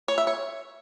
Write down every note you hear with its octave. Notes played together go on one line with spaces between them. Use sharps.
C#5
E5
C#5